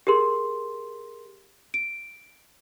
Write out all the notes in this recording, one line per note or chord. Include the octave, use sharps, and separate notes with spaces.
G4 G#4 A#4 C6
D7